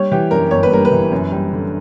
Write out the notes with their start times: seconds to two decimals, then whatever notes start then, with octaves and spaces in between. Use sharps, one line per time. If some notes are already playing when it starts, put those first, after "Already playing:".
Already playing: G3 C#5
0.11 E3 G4
0.31 F#2 A#4
0.51 G1 C#5
0.63 B4
0.71 G3 A#4
0.85 B4
0.91 E3
1.12 F#2
1.31 G3
1.52 D3